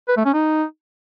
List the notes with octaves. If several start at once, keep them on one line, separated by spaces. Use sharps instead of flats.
B4
A3
C#4
D#4